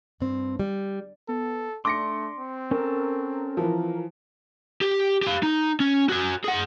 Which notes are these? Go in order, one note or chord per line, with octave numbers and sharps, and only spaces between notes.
G2 C4
G3
B3 A4
A3 D4 C6 D6 A#6 C#7
C4
C#4 A4 A#4
E3 F3
G4
G4 F5
D#4
C#4
F#4 G#5
G#4 F#5